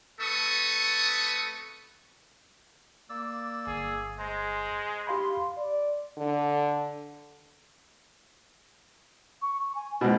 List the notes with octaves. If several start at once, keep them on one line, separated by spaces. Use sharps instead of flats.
A3 C4 A4 B4 C#6 D#6
A#3 D5 E6
G1 G#4
G#3 C5 A#5
G4 F5 B5 C6
D5
D3
C#6
G#5
C#2 B2 C5